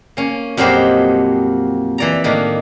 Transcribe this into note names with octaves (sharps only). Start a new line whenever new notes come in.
A#3 C#4
F2 A#2 F#3 G4 C5 D#5
E3 D5 A#5
A2 D#3 A#3 D4